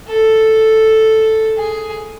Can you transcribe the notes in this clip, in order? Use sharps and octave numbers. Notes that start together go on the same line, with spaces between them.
A4
G#4